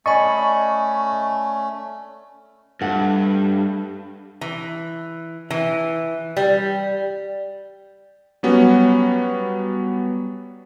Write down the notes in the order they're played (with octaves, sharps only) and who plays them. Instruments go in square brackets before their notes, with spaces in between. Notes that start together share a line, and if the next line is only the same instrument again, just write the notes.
[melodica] A3 C#4 [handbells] D5 B5 [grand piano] D#5 G#5 [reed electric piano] C#6
[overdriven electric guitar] G2 [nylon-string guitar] A3 F#5
[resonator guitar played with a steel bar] E3
E3
G3
[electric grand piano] F#3 G3 B3 C#4 F#4